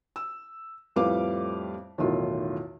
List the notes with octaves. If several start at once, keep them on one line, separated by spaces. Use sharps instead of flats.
E6
F2 A2 G3 B4 F5 D6
B1 E2 A2 D#3 F4